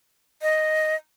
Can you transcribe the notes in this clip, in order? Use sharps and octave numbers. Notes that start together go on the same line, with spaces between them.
D#5